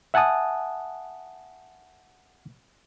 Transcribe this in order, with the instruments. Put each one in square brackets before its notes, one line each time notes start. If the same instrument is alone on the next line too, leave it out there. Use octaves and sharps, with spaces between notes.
[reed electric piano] E5 F#5 G#5 A5 D#6